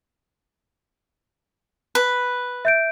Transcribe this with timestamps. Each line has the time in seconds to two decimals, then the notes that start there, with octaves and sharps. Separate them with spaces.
1.95 B4
2.65 E5 G6 D7